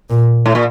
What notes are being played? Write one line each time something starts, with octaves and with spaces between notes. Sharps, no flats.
A#2
A2
A#2